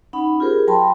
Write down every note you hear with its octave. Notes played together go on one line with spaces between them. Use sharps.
C#4 D#4 F#5 B5
F4 G4 G#4 A#4 C5
F#3 G5 A5 B5 C6